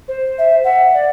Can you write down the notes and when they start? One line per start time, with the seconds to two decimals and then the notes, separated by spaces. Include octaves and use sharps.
0.08 C5
0.38 E5
0.63 E5 F#5
0.94 D5